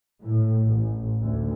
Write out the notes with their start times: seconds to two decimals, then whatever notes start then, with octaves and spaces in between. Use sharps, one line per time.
0.22 A2
0.69 A1
1.21 D2